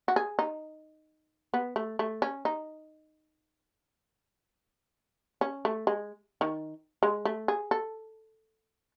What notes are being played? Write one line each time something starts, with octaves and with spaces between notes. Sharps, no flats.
F#4
G#4
D#4
B3
A3
A3
C#4
D#4
C#4
A3
G#3
D#3
G#3
A3
G#4
A4